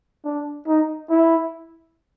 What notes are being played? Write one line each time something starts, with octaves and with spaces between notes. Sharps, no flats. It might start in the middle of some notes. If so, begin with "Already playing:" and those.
D4
D#4
E4